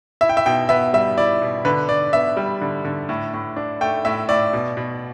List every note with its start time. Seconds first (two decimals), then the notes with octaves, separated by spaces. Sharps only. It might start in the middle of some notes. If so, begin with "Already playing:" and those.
0.21 E4 E5
0.29 G5
0.37 E5
0.46 B2 G5
0.69 B3 E5
0.93 G3 E5
1.17 E4 D5
1.42 B2
1.65 D3 B4
1.89 D3 D5
2.13 B3 E5
2.37 G3
2.61 D3
2.85 D3
3.09 A2
3.34 A2
3.56 D4
3.81 A3 G5
4.05 A2 E5
4.29 A2 D5
4.53 B2
4.77 B2